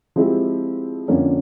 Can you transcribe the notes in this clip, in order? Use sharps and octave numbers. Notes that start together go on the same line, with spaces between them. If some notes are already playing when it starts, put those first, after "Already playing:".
F3 G#3 C4 E4 G4
F2 D3 F3 A#3 C#4